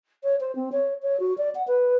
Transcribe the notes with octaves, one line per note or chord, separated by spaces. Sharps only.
C#5
C5
C4
C#5
C#5
F#4
D5
F#5
B4